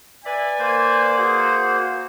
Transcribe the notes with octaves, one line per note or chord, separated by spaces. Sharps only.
B4 D5 E5 G#5
A#3 C5
F#4 G#4 F#5